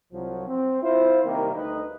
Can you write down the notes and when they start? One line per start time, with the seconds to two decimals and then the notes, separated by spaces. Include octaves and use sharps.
0.13 C2 F3 F#3
0.48 C4
0.83 E4 F4 C5
1.25 C3 D#3 G3 A#3
1.55 D2 D#4 B4 D#5